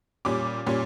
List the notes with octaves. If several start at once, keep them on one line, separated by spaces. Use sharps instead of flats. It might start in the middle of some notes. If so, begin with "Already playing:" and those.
A#2 G3 C#4 D6
A#2 G3 C#4